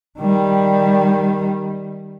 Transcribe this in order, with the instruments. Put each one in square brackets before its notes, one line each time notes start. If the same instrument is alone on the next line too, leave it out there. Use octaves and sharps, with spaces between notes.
[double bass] D#3 G3